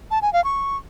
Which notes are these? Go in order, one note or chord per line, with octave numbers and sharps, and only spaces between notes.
A5
G#5
F5
C#6